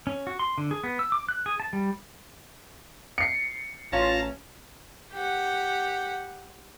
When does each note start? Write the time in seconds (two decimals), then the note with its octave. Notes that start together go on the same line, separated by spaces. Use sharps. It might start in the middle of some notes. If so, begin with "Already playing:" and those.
0.07 C#4
0.27 F#4
0.39 C6
0.58 D3
0.71 G#4
0.84 B3
0.99 E6
1.12 D6
1.29 F#6
1.46 G#4
1.60 A5
1.73 G3
3.18 C7 C#7
3.92 A1 C#4 F4 A5 A#5
5.12 G4 F#5